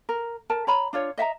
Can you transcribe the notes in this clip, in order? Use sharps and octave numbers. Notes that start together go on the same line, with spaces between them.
A#4
A#4 A5
C#5 A#5 B5
D4 F4 C#5
D#5 E5 F#5 A#5